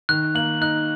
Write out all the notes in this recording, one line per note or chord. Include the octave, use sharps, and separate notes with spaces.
D#3 F#6
A#3 F#7
D#4 F#6